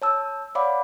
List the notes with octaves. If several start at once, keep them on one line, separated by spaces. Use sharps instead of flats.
C#5 A5 E6
C#5 D5 F5 F#5 B5 D6